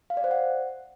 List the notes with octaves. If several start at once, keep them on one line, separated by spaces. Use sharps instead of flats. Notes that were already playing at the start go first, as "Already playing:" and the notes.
F5
D5
C5
F#5